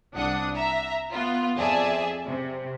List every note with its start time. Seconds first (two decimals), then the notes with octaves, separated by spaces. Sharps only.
0.14 C2 D4 F#5 D#6
0.54 E5 A#5
1.12 B3 F4
1.57 F2 G#4 D5 E5 A5
2.28 C3